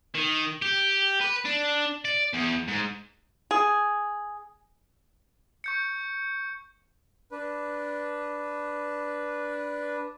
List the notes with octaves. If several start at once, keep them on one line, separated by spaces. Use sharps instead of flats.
D#3
G4
B4
D4
D5
E2
G#2
G#4
C#6 G6 C#7
D4 B4